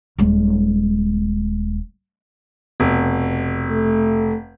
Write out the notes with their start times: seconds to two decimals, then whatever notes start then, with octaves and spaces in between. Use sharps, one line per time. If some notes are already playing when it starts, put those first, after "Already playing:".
0.19 D#1 G#3
2.80 F1 B2
3.70 A3